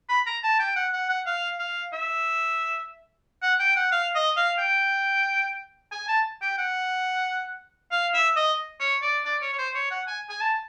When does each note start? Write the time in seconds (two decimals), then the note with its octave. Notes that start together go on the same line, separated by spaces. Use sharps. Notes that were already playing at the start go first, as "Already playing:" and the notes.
0.09 B5
0.26 A#5
0.43 A5
0.59 G5
0.76 F#5
0.93 F#5
1.09 F#5
1.26 F5
1.59 F5
1.93 E5
3.42 F#5
3.60 G5
3.76 F#5
3.92 F5
4.15 D#5
4.37 F5
4.59 G5
5.92 G#5
6.08 A5
6.42 G5
6.58 F#5
7.91 F5
8.13 E5
8.36 D#5
8.80 C#5
9.02 D5
9.25 D5
9.42 C#5
9.53 C#5
9.58 C5
9.74 C#5
9.91 F#5
10.08 G#5
10.30 G#5
10.41 A5